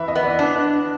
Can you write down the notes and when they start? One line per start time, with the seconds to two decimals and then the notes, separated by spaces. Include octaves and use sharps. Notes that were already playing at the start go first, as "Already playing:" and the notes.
Already playing: E3 E5
0.08 D#5
0.15 B3
0.23 D5
0.39 D4